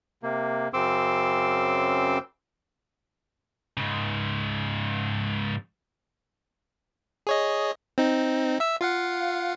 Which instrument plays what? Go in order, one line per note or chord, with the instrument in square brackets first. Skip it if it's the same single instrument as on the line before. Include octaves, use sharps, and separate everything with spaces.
[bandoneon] C3 A#3
F#2 C#3 C4 C6 D6 E6
[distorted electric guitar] G#2 C#3
[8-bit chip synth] G#4 C#5 D#5
C4 D#4
E5 E6
F4 F5 F#5